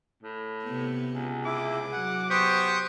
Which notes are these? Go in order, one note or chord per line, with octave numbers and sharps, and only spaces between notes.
A2
C3 B3
C#2
E4 G#4 D6
F#3 F#5
B3 G4 C5 C#6 D#6